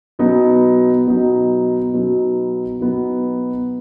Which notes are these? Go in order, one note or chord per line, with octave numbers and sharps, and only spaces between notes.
B2 F#3 B3 D#4
B2 F#3 B3 D#4
B2 F#3 B3 D#4
B2 F#3 B3 D#4